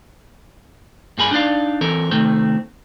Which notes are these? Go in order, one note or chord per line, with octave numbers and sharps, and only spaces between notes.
G2 A#3 G#4 B5
D4 D#4 D5 F5
E3 C4 A4 A#4
C3 D#3 A3 C4